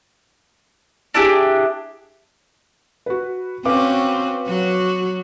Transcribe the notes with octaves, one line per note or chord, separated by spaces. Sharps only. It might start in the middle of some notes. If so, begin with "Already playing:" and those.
D4 E4 G4 G#4
F#4 B4
C4 C#4 F#4 B4 F5 D6
F#3 F#4